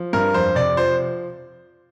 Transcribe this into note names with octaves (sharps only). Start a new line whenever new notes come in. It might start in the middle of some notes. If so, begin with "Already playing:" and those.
Already playing: F3
G2 A#4
F2 C5
C3 D5
F3 C5